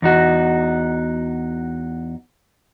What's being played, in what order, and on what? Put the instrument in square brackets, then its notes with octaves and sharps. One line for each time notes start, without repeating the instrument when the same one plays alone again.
[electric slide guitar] E2 D#4 F#4